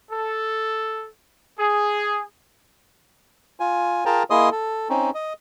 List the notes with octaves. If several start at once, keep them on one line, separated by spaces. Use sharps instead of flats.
A4
G#4
F4 G#5
F4 G#4 A#4 G5 A5 A#5
A#3 E4 G#4 D#5 C6 D#6
A4
C4 C#4 D#4
D#5